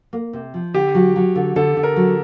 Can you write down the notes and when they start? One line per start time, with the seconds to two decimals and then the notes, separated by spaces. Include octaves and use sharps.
0.13 A#3
0.33 C3
0.54 F3
0.74 D3 G4
0.95 F#3
1.16 F#3
1.36 D3
1.56 D3 A4
1.77 D3
1.83 A#4
1.96 F#3